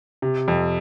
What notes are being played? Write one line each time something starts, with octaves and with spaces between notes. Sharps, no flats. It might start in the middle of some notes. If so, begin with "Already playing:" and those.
C3
F2